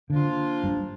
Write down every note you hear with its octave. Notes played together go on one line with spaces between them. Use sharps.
D3 F3 A#3 D4 F4
G2